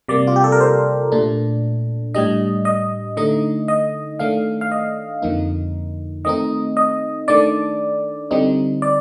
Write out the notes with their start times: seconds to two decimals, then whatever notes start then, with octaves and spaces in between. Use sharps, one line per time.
0.08 C3 G3 A#3 D5
0.27 F4
0.36 G4
0.44 A4
0.52 A#4
0.60 C5
1.12 A#2 A3 D4
2.14 A2 G3 D4 D#5
2.65 D#5
3.17 D3 A3 D#4 D#5
3.68 D#5
4.19 D#3 A3 D4 F5
4.61 F5
4.72 D#5
5.22 F2 D3 F3 A#3 D#4
6.25 D#3 A3 C4 D#4 D#5
6.77 D#5
7.28 D#3 A3 D4 D5
8.31 D3 G3 C4 D#4
8.82 D5